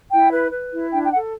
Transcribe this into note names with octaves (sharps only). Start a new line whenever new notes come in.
E4 G5
B4
B4
E4
D4 G5
G5
A4 F#5